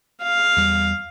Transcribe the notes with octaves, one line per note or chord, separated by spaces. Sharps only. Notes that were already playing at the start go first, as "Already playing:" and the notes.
F5
E2 G3